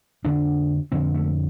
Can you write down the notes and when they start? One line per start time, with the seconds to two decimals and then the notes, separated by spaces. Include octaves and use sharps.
0.24 F2 D3 D4
0.92 F2 D3 C4
1.15 A3